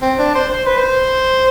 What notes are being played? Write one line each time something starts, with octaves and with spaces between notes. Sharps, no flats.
C4
D4
C5
C5
B4
C5